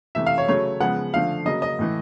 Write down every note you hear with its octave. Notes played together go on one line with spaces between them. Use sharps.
C3 E3 A3 E5
F5
C#5
C#3 F#3 A3 C#5
C#3 F3 G#3 B3 F#5
D3 F3 A3 F5
C#3 F#3 A#3 D#5
D#5
A2 E3 A3